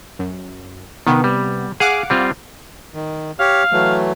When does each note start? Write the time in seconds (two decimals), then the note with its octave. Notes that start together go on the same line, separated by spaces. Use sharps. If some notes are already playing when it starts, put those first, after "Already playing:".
0.19 F#2
1.07 C3 D#3 B3
1.24 G3
1.80 G#4 F5 F#5 D6
2.10 G3 C4 F4
2.94 D#3
3.39 G4 C#5 F5
3.72 E3 F#3 A3